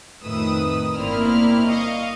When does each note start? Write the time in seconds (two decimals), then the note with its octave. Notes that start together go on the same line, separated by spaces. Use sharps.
0.24 F2 A2 D#3 B4 D#6 E6
0.96 G1 A#3 C4 E4 D5 F6
1.66 D#5 F5 C#6 D#6